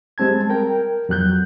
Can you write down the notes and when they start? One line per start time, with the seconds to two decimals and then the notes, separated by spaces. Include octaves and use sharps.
0.18 G3 G#3 C4 A5 G#6
0.50 A#4 G5
1.09 F2 F#3 F#6 G6